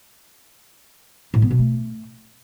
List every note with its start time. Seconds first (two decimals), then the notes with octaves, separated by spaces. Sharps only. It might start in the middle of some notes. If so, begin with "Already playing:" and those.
1.34 A2
1.42 B3
1.51 B2
1.59 A3